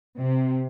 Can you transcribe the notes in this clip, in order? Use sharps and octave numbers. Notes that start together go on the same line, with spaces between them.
C3